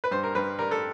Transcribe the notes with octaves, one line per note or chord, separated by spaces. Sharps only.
B4
G2 C5
A#4
G2 B4
G3 A#4
A4